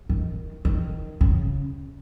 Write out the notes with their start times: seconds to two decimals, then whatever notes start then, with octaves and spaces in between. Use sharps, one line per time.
0.09 D#3
0.65 D#3
1.21 C#3